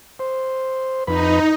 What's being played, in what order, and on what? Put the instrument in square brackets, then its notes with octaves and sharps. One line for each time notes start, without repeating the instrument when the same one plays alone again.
[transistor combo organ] C5
[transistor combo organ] F2 B4 B5 [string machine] D#4